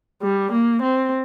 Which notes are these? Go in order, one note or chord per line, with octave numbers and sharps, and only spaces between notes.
G3
A#3
C4